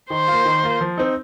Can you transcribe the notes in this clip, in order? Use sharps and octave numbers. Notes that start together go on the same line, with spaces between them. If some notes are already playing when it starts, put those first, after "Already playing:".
D#3 C5
A#3 F4
D#3
A#3 F4
F3
C4 D#4